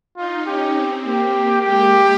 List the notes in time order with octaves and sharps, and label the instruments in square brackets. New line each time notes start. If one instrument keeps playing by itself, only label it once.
[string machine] D#4 [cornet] F4
[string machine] C#4 [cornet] G4
[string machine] C4
[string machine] A#3 [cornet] G4
[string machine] G#3 [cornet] G4